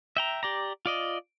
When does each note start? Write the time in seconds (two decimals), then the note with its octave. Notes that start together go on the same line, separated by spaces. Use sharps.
0.17 E5 G5 A#5
0.43 G4 D5 A#5
0.86 F4 D5 D#5